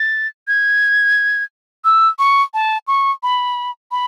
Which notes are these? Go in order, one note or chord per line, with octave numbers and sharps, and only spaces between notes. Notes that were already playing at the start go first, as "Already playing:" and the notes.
Already playing: A6
G#6
E6
C#6
A5
C#6
B5
B5